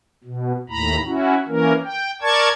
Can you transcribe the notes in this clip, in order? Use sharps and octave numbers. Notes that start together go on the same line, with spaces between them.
B2
D#2 A2 A#5 B5
C#4 E4 F#4
E3 A#3 C#4 A#4
G5
A#4 D5 A5 C#6 G#6